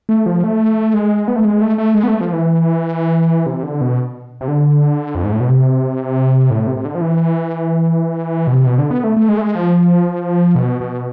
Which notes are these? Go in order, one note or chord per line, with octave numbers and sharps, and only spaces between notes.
A3
F3
A3
G#3
B3
A3
G#3
A3
A3
G#3
B3
A3
F3
E3
C3
D3
B2
C3
D3
F2
G#2
A2
B2
C3
A2
C3
C3
D3
F3
E3
B2
C3
B2
D3
B3
A3
A3
G#3
A3
G#3
F3
B2
B2